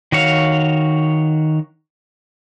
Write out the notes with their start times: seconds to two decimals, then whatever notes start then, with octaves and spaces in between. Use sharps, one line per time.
0.12 D#3 F#4 C#5 F5